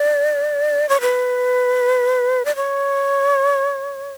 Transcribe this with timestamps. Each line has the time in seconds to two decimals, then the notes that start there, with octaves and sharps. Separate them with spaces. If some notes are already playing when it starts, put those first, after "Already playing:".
Already playing: D5
0.89 C#5
1.01 B4
2.45 D5
2.56 C#5